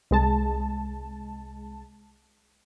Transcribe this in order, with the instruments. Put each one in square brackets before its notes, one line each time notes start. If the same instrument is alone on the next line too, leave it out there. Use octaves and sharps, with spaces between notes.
[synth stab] C2 G#3 A5